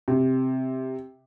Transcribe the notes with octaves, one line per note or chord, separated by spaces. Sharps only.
C3